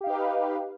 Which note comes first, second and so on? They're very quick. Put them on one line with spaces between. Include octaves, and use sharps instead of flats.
G4 F5 D#4 B4